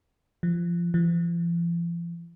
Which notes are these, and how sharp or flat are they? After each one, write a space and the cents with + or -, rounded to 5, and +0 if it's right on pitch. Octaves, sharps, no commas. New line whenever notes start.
F3 -20
F3 -45